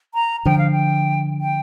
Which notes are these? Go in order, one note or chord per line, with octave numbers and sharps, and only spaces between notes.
A#5
D3 F3 G5
F5
G5
G5